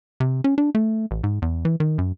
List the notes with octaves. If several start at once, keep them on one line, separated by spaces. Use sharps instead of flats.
C3
C#4
D4
A3
A1
G#2
E2
E3
D#3
F#2